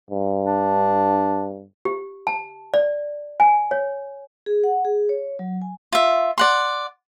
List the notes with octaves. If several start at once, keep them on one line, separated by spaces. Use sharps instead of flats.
G2
D4
G4
A5
D5
G#5
C#5
G#4
F#5
G#4
C#5
F#3
G#5
F4 E5
D5 F#5 C6